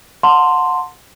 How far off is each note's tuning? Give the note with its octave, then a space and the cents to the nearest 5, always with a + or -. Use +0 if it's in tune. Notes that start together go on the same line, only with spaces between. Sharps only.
F#5 -30 A5 +30 C6 +0